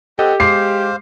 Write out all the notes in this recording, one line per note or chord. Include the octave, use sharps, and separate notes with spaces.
C4 G4 A4 D#5 F#5 G5
G#3 C5 F5 D6 C7